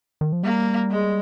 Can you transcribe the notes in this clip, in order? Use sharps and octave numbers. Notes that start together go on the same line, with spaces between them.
D#3
F3
G3 A#3
G#3